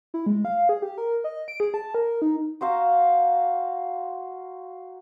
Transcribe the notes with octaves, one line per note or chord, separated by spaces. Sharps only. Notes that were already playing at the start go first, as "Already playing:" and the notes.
E4
G#3
F5
G#4
G4
A#4
D#5
D7
G#4
A5
A#4
D#4
F#4 C5 F5 A#5